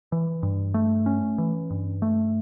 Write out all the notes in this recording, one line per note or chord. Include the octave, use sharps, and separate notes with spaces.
E3
G2
A3
C#4
E3
G2
A3